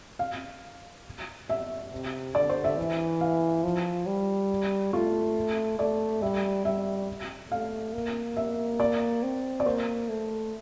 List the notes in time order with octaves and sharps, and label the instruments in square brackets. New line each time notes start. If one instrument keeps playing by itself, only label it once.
[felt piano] F5
E5
[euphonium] C3
[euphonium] D3 [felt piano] D5
[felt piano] C5
E5
[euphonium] E3
[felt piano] F5
[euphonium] F3
G3
[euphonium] A3 [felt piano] F4
[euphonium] A3 [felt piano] D5
[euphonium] G3 [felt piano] E5
[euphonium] G3 [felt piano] E5
[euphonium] A3 [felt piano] F5
[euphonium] A#3
[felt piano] E5
D5
[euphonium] C4
[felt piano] D5
[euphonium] A#3 [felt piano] C5
[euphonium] A3